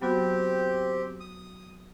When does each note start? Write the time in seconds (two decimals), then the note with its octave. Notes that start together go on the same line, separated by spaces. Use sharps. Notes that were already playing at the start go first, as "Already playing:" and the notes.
0.02 F#3 B3 C4 F#4 G4
1.20 D#6